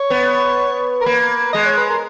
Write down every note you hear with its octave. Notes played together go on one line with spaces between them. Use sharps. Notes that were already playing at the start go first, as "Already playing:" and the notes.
Already playing: C#5
B3
A#4
A#3 B4
G#3 D#5
C#5
B4
A#4